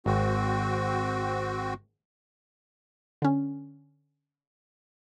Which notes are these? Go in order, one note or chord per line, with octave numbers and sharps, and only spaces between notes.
G#1 C4 F#4
D3 C#4